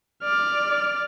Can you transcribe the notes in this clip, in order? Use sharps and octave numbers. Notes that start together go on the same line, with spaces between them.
D5 F6